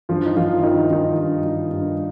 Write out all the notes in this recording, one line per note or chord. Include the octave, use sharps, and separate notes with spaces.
G2 F3 F4
D#4
D#3 F3 F4
G2 D#3 D#4
D#3 D#4
G2
D#3
G2